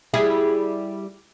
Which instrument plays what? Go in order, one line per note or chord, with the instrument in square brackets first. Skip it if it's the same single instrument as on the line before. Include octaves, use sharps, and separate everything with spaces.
[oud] G3 E4 G#4